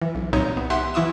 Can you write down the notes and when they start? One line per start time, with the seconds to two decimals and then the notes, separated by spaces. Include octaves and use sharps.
0.02 E3
0.15 B1
0.33 C2 A#2 D#4 C#5 A#5
0.57 B3
0.70 G4 E5 F#5 G#5 C6 F#6
0.94 E3 E4 C#6 D#6 E7